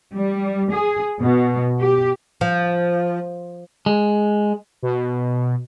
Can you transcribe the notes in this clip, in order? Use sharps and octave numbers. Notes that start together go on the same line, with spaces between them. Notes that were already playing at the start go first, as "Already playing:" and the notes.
G3
G#4
B2
G4
F3
G#3
B2